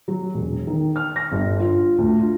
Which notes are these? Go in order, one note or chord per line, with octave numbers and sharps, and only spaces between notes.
F#3
E1
D#3
F6
A#6
G1
F4
D2
F4